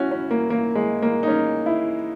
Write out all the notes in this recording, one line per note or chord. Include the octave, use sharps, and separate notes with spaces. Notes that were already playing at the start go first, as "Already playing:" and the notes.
Already playing: C#4 E4 F#4
C#4
A#3
A#3
G#3
A#3
D#4
C#4
E4